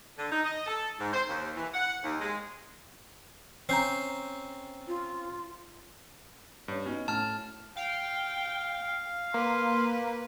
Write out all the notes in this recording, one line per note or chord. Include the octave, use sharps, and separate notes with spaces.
D3
D#4
D#5
A4
G#2
C5
D#2
E3
F#5
D#2
G#3
C4 C#4 A#5 G6 C7
F4
G2 C#4 C#5
B3 C#4 D#4 F#4
A2 A5 F6
F5 G5
A#3 B4 C6